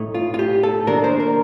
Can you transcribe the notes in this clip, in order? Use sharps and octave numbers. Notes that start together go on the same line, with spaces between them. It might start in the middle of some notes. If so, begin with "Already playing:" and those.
Already playing: A2 A3 D#4
F4
F4
G4
A4
D#3 A#3 D4 A#4
C5
A#4